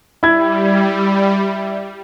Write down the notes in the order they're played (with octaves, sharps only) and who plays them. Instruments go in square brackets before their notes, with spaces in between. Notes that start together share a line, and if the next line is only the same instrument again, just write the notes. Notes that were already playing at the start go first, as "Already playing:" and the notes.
[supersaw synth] G3 [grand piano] E4 G#6